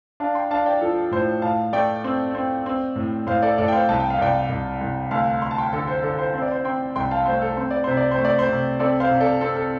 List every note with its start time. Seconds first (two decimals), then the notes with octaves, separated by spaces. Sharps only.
0.20 D4 F5 A5
0.35 G5 C6
0.51 D4 F5 A5
0.66 D5 G5
0.81 F3 A4
1.11 A2 C5
1.42 A2 F5 A5
1.73 A3 D5 G5
2.04 C4
2.35 C4
2.66 C4
2.96 A2
3.27 A2 C5 F5
3.42 A4 D5
3.58 A2 A4 D5
3.68 G5
3.72 C5 F5
3.89 C2 A5
4.00 G5
4.10 F5
4.19 C2 D5 G5
4.50 C2
4.81 C2
5.11 D2 F5 A5
5.42 D2 C6
5.51 A5
5.58 G5 C6
5.73 D3 A4
5.88 C5
6.03 D3 A4
6.19 C5
6.34 C4 C5
6.42 D5
6.51 C5
6.65 C4 G5 C6
6.96 C2 G5 C6
7.11 F5 A5
7.26 A3 C5
7.42 A4
7.57 C4 C5
7.71 D5
7.84 C3 C5
7.97 D5
8.11 C5
8.18 A3
8.25 D5
8.39 C5
8.49 C3
8.79 C4 A4 D5
9.00 C5 F5
9.11 C3
9.20 A4 D5
9.41 C4 A4
9.57 A4